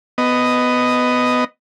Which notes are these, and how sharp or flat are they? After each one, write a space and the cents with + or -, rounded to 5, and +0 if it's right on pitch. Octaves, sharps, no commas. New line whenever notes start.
B3 +15 D#5 +0